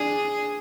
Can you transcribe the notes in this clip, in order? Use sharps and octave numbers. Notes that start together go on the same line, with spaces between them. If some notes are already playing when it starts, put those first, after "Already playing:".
Already playing: D4 G#4